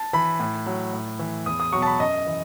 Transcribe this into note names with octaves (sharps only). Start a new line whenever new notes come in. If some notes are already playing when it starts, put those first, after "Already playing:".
Already playing: A5
E3 B5
A2
F#3
A2
E3
E2 D#6
D#6
B2 F#3 C#6
A5
B5
F#2 D#5
E3